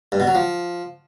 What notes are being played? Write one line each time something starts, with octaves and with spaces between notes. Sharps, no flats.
G2
B2
F#3
F3